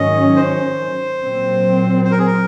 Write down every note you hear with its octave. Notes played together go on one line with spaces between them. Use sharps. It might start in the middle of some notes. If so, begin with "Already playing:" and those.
Already playing: G#2 D#3 F#3 C#4 D#5
C5
A#2 F#3 C4
C5
A#4
G#4
A#4